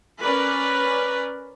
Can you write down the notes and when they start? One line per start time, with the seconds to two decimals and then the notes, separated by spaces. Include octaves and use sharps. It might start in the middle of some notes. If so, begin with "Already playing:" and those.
0.22 C#4 A#4 B4 D5